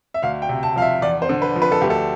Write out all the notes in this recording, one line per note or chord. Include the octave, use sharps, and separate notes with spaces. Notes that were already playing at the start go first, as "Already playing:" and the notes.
E5
D2 F5
G5
C3
A5
F3 F5
E5
E2 D5
C5
D3
B4
F3
B4
A4
D2 G4
A4